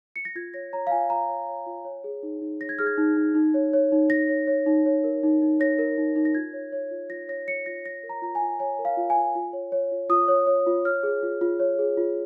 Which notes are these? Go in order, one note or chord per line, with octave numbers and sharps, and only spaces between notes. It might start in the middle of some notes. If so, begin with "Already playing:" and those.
C#7
A#6
F4 G#6
C#5 A#6
C#5 A#5
F5
F4 G#5
F4 A#5
C#5
C#5
F4
C#5
G#4
D#4
D#4
C#5 A#6
G#6
G#4 F6
G#6
D#4
D#4
D#4
C#5
C#5
D#4
D#4 A#6
C#5
C#5
D#4
C#5
A#4
D#4
D#4
C#5 A#6
A#4
D#4
D#4
A#6
F4 G#6
C#5
C#5
F4
F4 A#6
C#5 A#6
C#5 C#7
F4 A#6
C#5 A#6
A#4
A#5
F4 A#5
G#5
F4
C#5 G#5
A#4
F5
F4
G#5
F4
F4
C#5
C#5
F4
F4 D#6
C#5
C#5
F4
C#5 F6
G#4
F4
F4
C#5
G#4
F4